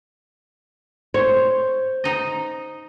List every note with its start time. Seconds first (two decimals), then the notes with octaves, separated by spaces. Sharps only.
1.14 C5 C#5
2.04 D#4 D#5